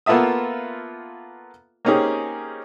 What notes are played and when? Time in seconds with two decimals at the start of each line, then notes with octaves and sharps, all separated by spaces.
0.06 A#3 B3 F4 A4 E5 D#6
1.85 A#3 C4 C#4 D#4 G4 G#4